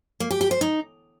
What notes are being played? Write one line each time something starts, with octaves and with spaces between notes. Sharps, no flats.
A#3
G4
G4
C5
D#4